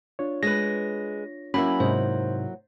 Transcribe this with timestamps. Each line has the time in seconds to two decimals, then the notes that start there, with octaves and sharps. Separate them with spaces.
0.19 D4 F4 C#5
0.43 G#3 B4 A#6
1.54 F#3 A#3 C#4 E4 B5
1.80 G#2 C3 D#4 C5